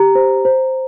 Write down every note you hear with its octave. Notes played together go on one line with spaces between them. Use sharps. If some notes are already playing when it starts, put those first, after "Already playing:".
Already playing: G4 A#5
C5
C5